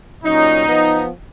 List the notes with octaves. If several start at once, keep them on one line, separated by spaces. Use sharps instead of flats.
A#2 F#3 C#4 D#4
F3 B3